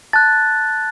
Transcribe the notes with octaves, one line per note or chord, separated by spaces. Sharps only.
A5 F#6 A6